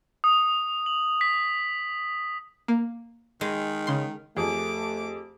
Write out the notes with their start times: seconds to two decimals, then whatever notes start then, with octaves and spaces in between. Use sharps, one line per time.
0.24 D#6
0.86 F#7
1.21 B6
2.68 A#3
3.41 D#3 G#3
3.87 C#3 C6
4.37 F2 A3 G4 G#4 D6